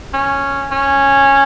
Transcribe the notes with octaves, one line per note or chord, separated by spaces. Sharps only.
C#4
C#4